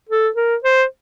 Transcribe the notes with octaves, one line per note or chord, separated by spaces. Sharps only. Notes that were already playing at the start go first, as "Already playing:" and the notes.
A4
A#4
C5